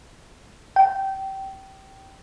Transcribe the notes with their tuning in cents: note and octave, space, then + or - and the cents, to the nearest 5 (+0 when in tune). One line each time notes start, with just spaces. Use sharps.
G5 -15